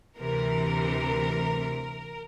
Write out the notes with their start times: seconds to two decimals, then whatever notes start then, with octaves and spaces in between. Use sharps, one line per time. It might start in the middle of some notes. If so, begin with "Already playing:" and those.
0.18 D2 C3 E3 A#4